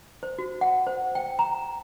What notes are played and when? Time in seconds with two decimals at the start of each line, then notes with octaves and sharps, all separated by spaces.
0.23 C5
0.39 F#4
0.61 F#5
0.87 C5
1.15 G5
1.39 A#5